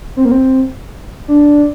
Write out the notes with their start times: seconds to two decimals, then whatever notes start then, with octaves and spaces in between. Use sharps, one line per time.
0.17 C4
0.25 A#3
0.31 C4
1.28 D4